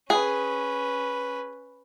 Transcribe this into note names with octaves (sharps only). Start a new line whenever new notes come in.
C#4 G#4 B4